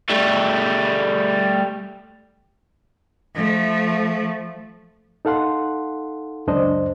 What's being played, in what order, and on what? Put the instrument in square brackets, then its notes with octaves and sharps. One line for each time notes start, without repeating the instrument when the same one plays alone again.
[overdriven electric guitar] G3 A3
[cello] F3 A3
[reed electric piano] D#4 A4 F5 F#5 C6
C#2 F#2 D4 C5 D#5